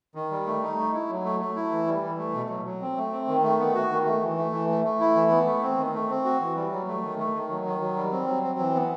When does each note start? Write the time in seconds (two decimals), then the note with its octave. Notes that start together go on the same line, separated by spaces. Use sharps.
0.15 D#3
0.31 G3
0.46 A3
0.62 D#4
0.78 A3
0.93 E4
1.10 F#3
1.24 A3
1.40 A3
1.56 E4
1.71 E3
1.87 G3
2.03 E3
2.18 A3
2.34 B2
2.49 F#3
2.65 F#3
2.81 C4
2.97 A3
3.12 C4
3.28 D#3
3.43 A3
3.59 B3
3.74 F#4
3.91 D#3
4.06 A3
4.22 E3
4.37 A3
4.52 E3
4.69 A3
4.84 A3
5.00 E4
5.15 E3
5.31 B3
5.46 A3
5.62 C4
5.77 D#3
5.94 A3
6.09 C4
6.25 F#4
6.41 E3
6.56 G3
6.71 F#3
6.88 A3
7.03 D#3
7.19 A3
7.34 D#3
7.50 F#3
7.65 D#3
7.81 F#3
7.97 G3
8.12 C4
8.28 F#3
8.43 C4
8.59 E3
8.75 B3